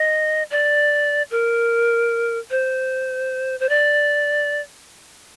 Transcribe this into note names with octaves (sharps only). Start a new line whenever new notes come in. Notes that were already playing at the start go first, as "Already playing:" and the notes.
Already playing: D#5
D5
A#4
C5
C5
D5